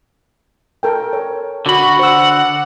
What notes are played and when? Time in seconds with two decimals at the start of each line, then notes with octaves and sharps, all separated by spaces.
0.83 A4 A#4 G5
1.13 C#5
1.66 D3 F#4 B5
1.99 C5 F#5 E6